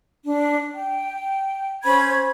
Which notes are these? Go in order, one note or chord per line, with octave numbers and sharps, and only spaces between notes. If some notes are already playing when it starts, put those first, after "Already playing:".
D4
G5
C#4 C5 B5 G#6